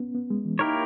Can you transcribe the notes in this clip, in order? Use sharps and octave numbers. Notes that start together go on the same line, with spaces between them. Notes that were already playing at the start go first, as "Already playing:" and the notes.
Already playing: B3 C#4
B3
G#3
E3
A#3 D#4 E4 G4 A#4 C#5